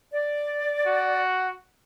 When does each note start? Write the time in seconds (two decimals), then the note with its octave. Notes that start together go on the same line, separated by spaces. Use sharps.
0.14 D5
0.86 F#4